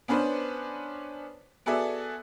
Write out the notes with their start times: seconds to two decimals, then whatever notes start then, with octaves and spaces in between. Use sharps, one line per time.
0.08 B3 C#4 D4 B4 C5
1.66 B3 F#4 G#4 A4 D5 E5